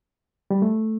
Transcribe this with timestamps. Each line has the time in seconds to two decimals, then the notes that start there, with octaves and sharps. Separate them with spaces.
0.51 G3
0.62 A3